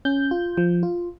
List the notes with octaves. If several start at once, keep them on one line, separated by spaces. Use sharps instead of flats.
C#4 G6
F4
F3
F4